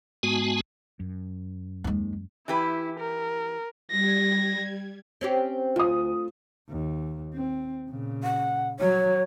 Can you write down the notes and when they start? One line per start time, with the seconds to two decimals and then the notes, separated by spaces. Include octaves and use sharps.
0.23 G#2 G#3 B3 F#4 G#5 A5
1.00 F#2
1.84 D#2 G#3
2.48 E3 E4 G4 B4
2.99 A#4
3.91 G3 G#6 A#6
5.21 C4 C#4 G4
5.76 D2 F4 D#6
6.69 D#2
7.34 C4
7.89 A#2 C#3
8.24 F#5
8.80 F#3 C#5